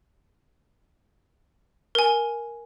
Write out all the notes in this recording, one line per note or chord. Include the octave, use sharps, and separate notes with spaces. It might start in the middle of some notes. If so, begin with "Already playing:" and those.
A#4 G#5